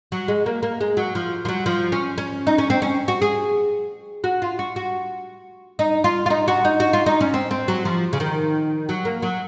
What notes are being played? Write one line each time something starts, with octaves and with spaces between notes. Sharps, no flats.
F#3
G#3
A#3
A#3
G#3
F#3
F3
F3
F#3
F3
C#4
C#4
D#4
C#4
C4
C#4
F#4
G#4
F#4
F4
F#4
F#4
D#4
F4
F4
D#4
F#4
D#4
F#4
F4
D#4
C#4
C4
C4
F#3
F3
C#3
D#3
F#3
A#3
F#3